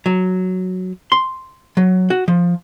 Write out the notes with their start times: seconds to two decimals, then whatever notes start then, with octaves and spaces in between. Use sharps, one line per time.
0.06 F#3
1.12 C6
1.77 F#3
2.10 F#4
2.28 F3